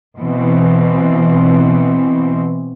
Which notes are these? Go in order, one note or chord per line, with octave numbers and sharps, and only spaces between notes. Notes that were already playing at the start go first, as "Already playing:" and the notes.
B2 E3 C4